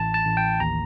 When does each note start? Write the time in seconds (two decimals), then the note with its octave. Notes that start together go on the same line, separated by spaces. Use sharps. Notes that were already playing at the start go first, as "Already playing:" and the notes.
Already playing: A1 A5
0.14 A5
0.25 A1
0.37 G5
0.60 D#2 A#5